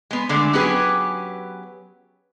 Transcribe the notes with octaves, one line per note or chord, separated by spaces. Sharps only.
G#3 B3
D3 G#3 A3
F#3 B3 C#4 G4 G#4 B4